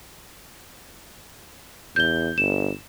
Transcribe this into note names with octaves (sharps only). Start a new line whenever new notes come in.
E2 G6 G7
G1 E7